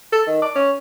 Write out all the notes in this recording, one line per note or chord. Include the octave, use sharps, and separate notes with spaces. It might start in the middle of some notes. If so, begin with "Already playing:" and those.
A4
D#3
D5
C#4